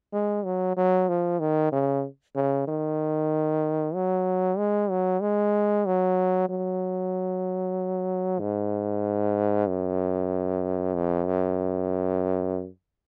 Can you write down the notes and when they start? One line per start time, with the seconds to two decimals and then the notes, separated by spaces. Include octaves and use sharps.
0.13 G#3
0.45 F#3
0.77 F#3
1.09 F3
1.40 D#3
1.72 C#3
2.35 C#3
2.67 D#3
3.94 F#3
4.58 G#3
4.90 F#3
5.22 G#3
5.86 F#3
6.49 F#3
8.40 G#2
9.67 F#2
10.94 F2
11.26 F#2